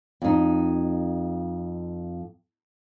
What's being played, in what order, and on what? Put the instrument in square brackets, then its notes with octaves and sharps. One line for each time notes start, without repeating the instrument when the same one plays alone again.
[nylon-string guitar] F2 D#4